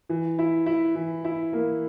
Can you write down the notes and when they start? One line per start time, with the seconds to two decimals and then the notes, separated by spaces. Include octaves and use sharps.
0.09 E3
0.39 E4
0.66 E4
0.95 E3
1.25 E4
1.53 A#3